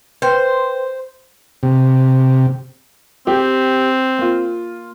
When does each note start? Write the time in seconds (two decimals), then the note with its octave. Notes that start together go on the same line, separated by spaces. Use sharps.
0.22 B4 C5 G5
1.63 C3
3.27 C4 G4
4.18 A#3 F4